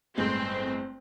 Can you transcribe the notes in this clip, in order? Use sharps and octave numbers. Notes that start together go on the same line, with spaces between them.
G1 A2 G#3 C4